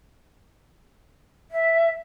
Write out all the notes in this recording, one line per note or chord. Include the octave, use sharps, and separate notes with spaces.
E5